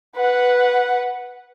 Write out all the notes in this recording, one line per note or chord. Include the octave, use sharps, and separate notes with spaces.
B4 F#5